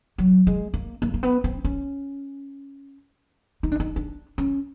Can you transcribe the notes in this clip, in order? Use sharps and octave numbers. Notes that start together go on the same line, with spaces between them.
F#3
G#3
A#3
A#3
A#3
B3
C4
C#4
D#4
D4
D#4
D4
C#4